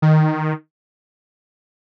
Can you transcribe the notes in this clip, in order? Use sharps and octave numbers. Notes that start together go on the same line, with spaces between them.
D#3